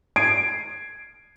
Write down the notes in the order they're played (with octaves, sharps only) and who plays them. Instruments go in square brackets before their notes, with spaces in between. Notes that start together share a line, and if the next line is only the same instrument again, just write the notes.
[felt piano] G#6 C7 D7 D#7